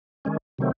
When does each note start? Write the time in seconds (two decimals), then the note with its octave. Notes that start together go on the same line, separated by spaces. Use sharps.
0.25 D#3 G#3 C#4
0.58 C3 D#3 F#3 A3 C4